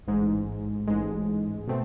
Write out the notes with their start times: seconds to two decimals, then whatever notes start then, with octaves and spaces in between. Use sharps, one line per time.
0.07 A1 G#2 G#3
0.88 A1 G#2 G#3
1.68 B2 A3 C4